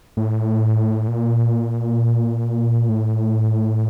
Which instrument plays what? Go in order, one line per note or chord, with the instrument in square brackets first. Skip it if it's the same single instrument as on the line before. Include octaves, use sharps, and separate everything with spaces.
[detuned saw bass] A2
A#2
A2